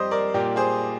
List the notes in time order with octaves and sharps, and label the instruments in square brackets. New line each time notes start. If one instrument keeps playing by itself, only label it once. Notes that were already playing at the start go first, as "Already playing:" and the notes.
Already playing: [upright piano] F2 G3 C5 D#5
A#4 D5
A#2 G4 A#4
G#4 C5